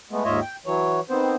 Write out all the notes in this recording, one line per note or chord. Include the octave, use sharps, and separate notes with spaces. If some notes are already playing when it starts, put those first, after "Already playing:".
G#3 A3 B3
D#2 G#2 F4 C#5 D#5 E5
G5
E3 F#3 C#5
D#3 B3 C4 C5